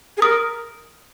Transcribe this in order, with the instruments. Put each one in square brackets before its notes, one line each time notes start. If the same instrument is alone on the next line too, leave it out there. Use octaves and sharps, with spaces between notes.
[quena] G#4
[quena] A#4 [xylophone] D#6